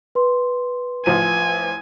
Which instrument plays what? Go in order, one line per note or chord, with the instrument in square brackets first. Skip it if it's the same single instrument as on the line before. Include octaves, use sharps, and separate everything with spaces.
[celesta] B4 C6
[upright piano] A1 F3 D#7 [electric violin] G#5